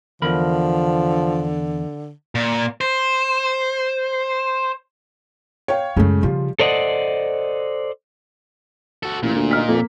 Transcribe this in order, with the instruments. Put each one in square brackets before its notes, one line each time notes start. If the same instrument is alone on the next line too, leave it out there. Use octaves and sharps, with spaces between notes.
[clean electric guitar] E2 A#4 B5 [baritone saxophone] D3 [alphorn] F3
[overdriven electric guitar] A#2
C5
[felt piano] C#5 F5 G5
[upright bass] F#2 G#3 [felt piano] A2 C#3 A3
[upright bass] C#3 [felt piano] F3 G3 F4
[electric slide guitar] A4 C5 D5 D#5 F#5
[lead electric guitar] F#4 A4
[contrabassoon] A1 [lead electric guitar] A#2
[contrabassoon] D2
[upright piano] D#4 F6 B6
[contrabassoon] F2 [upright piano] A#3